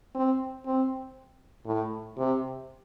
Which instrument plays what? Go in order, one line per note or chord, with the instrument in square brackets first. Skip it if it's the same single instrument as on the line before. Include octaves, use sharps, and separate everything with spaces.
[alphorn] C4
C4
A2
C3